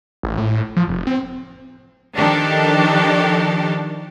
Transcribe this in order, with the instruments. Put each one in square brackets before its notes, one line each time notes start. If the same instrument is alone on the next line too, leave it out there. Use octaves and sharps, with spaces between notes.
[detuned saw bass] A1
A2
F3
F1
C4
[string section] D#3 F3 D4 G4 A4